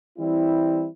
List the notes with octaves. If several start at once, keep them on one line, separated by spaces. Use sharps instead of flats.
E3 G3 C4 E4